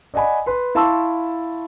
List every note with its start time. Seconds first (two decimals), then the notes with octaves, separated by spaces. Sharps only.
0.14 D5 D#5 F#5 G#5 B5
0.46 B4 C6
0.75 E4 F5 A5 C6 C#6 E6